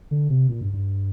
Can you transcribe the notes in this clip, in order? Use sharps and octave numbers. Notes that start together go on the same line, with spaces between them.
D3
C3
A#2
G2
G2